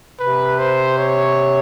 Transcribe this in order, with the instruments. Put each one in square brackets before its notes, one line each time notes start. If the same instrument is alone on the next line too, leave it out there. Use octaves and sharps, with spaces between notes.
[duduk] C3 [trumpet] B4
[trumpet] C5
C#5